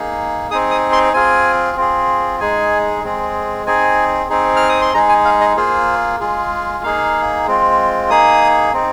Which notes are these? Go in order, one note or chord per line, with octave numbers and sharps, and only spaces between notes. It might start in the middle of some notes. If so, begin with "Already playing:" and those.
Already playing: A#3 D#4 G#4
C4 D#4 G#4 D#6
D#6
C6
C4 F4 G#4 G#5
C4 F4 G#4
G#3 D#4 G#4 G#5
G#3 C4 G#4
C4 D#4 G#4 G#5
C4 D#4 G#4
F6
D#6
C6
G#3 D#4 G#4 A#5
G#5
F5
D#5
A#3 F4 G#4 C5
G#3 F4 G#4
A#3 D#4 G#4 F5
G#3 C4 F4
A#3 D#4 G#4 D#6
C4 D#4